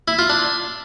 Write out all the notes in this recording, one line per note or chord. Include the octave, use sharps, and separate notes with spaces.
E4
F4
D4